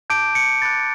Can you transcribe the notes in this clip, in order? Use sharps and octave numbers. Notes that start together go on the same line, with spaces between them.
A5 D6 G6 D7
C#7
B5 D6 F#6 A6